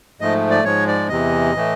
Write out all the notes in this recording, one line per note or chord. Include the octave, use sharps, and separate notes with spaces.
G#2 F3 A3 D#5
D5
G#2 F3 G#3 C#5
D5
E2 C3 E3 D#5
A2 E3 A3